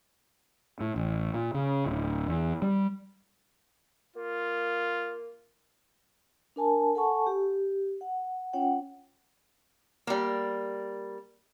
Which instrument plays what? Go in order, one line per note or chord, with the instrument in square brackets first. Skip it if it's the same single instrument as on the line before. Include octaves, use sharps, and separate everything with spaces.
[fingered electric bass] A2
A1
A#2
C#3
D1
E2
G3
[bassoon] A#3 [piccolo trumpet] F4
[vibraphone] D4 A#4 G#5 A5
A4 F#5 G#5 A5 C#6
G4
F#5
C#4 F4 C#5 F#5 G5
[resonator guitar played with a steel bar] G3 A#3